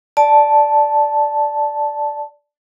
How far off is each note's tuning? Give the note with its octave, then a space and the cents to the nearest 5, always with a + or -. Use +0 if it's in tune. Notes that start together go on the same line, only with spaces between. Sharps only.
D5 +0 A5 -5